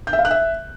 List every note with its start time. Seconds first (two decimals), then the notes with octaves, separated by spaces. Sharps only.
0.07 G6
0.13 E5
0.19 F5
0.25 F#6
0.31 E5